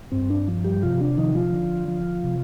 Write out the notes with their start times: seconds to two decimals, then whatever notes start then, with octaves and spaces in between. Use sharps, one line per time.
0.12 G2 C4
0.30 D4
0.47 F3
0.64 G3 G4
0.82 C3 F3 F4
1.01 D4
1.18 D#3 F3 D#4
1.35 F3 F4
1.53 D3
1.88 F3
2.24 C3